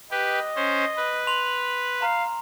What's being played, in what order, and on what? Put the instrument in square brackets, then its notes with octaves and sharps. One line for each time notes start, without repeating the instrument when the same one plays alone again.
[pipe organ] G4 B4 [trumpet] D#5
[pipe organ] C#4 C5
B4
[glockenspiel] C6 F7 F#7
[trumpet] F5 [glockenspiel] A#5